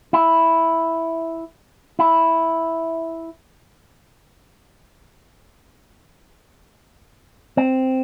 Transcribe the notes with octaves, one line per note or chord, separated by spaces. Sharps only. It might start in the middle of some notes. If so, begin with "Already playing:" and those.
E4
E4
C4